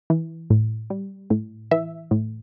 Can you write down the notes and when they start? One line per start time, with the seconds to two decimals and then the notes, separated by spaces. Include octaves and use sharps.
0.10 E3
0.50 A2
0.90 G3
1.30 A2
1.71 E3 E5
2.11 A2